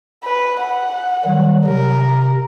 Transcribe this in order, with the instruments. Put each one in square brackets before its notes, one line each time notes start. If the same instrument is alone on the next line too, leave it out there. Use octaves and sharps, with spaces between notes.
[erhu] B4
F#5
[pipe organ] D#3 F#3 G3
[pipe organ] C3 [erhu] A#4